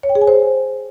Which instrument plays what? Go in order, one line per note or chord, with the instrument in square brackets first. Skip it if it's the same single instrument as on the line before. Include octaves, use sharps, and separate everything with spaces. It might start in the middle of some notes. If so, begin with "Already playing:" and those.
[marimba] C#5
G5
G#4
G#5
C5